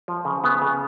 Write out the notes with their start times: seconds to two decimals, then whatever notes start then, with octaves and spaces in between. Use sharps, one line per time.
0.08 F3
0.25 C#3
0.44 C#3 B3
0.62 C#3